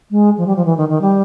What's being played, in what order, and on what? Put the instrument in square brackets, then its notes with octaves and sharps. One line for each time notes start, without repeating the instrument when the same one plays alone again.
[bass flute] G#3
F3
G3
F3
E3
D#3
D#3
G3